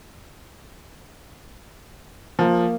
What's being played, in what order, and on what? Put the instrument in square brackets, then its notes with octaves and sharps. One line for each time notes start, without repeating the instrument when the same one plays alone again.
[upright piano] F3 [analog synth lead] A#3